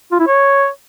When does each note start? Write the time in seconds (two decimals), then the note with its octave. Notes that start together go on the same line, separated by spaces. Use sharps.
0.12 F4
0.19 E4
0.27 C#5